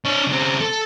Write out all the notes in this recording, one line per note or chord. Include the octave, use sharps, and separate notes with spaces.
D4 C#5
C#3 C4
A4